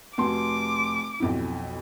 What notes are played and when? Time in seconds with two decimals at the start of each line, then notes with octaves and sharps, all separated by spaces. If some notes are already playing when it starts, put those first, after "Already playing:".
0.18 F1 F#4 C6 D6
1.20 B1 F2 E4